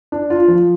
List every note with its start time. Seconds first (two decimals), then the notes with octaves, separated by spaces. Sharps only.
0.12 D4
0.30 F4
0.48 F3